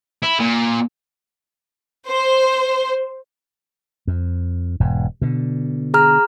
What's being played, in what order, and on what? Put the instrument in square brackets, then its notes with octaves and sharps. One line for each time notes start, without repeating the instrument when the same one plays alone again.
[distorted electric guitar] E4
A#2
[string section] C5
[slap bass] F2
E1 G#2
B2 D3
[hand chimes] G#4 A#5 F6